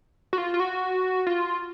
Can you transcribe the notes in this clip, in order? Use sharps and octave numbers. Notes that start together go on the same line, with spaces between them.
F#4
F4
F4
F#4
F4